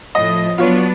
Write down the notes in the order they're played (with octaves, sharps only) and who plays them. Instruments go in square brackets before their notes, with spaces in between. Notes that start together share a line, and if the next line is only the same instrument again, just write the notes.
[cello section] A2 [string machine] F3 [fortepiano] D#5
[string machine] F#3 [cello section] B3 D4 [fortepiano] F4 C#5